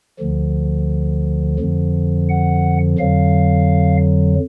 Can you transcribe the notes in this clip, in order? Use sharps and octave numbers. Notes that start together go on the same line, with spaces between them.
D2 D3 F3
F2 D3 F3
F#5
F2 D3 F#3 F5